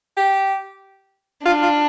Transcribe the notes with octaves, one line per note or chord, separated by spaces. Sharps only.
G4
D4 F4
F4